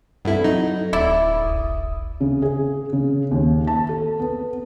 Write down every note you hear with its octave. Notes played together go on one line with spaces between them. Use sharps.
G2 C4 E4 A4 F#5
F#3 D#4
D1 E4 D5
G#1 D2 D#6
C#3
G#4
C#3
D#2
A5
A4
B3